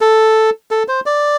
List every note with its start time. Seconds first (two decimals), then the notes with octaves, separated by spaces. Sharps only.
0.01 A4
0.71 A4
0.88 C5
1.06 D5